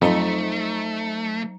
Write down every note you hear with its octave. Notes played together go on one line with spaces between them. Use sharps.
F2 F#3 A3 C4 D#4 A#5 C#7